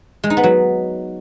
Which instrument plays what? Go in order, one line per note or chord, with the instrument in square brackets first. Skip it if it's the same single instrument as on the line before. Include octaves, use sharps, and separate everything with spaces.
[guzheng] G#3
D#4
B3
F#3